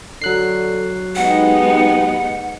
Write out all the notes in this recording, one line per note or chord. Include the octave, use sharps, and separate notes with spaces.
D3 F#3 F#6 C7
G#3 B3 D#4 G4 F#5